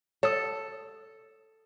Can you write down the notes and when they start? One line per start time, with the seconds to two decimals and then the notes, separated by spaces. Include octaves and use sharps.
0.23 A4 C#5 D#6